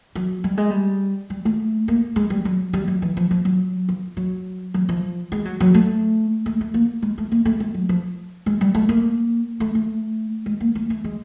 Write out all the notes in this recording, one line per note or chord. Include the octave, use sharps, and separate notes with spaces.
F#3
G3
G#3
G3
G3
A3
A#3
G#3
G3
F#3
G3
F#3
E3
F3
F3
F#3
F3
F#3
F#3
F3
G#3
F#3
F#3
A3
A3
A3
A#3
G#3
A3
A#3
A3
G#3
F#3
F3
G#3
G3
A3
A#3
A3
A3
G#3
A#3
A3
A3
G#3